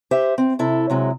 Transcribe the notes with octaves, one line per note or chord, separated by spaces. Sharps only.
G4 C5 E5
C4
C3 E4 A4
C3 F#3 G#3